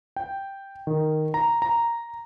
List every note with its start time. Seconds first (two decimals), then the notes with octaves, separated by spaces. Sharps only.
0.16 G5
0.87 D#3
1.34 A#5
1.62 A#5